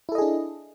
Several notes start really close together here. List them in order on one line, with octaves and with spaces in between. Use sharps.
E4 A4 D#5 G#4 D4